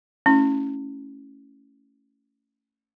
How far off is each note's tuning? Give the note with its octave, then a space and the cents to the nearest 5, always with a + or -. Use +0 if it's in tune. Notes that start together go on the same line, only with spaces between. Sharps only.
A3 +10 C#4 +0 E4 -15